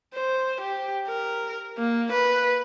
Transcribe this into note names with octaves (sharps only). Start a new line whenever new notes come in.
C5
G4
A#4
A#3
B4